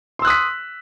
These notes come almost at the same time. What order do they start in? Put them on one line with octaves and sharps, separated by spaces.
C6 E6 F#6 D#6 B6